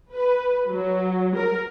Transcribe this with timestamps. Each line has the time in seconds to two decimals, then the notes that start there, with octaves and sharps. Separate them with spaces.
0.13 B4
0.68 F#3
1.36 A#4